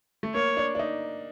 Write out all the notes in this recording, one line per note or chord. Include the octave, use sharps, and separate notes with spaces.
A3
A#3 C#5
D4
D4
D#4